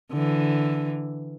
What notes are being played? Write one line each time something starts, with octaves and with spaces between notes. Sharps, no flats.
D3 E3